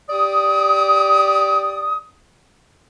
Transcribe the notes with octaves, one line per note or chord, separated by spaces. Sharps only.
G4 D5 D#6